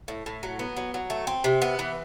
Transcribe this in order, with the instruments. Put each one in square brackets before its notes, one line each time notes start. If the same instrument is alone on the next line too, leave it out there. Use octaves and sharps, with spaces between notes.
[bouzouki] A2
A2
F#3
B3
F#3
F#3
A3
C4
C3
B3
E3